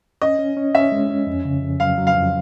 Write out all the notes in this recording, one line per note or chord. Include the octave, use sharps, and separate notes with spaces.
C#4 D#5
C#4
C#4
C#4 E5
G#3
C#4
F2
C#3
F2
F#3 F5
F#3
F5
F2